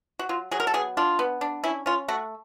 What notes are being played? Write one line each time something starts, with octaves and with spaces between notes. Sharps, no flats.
F#4
F#3 F4
F#3 G#4
A#4
A4
B3 G#4
D4 F4
B3
D4
C#4 E4
C#4 F4
A3 F#4